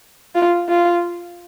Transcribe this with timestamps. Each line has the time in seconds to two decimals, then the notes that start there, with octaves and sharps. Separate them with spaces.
0.35 F4
0.69 F4